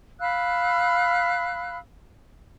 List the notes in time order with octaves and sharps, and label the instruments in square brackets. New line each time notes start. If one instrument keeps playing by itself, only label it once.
[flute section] F5 B5 E6 F#6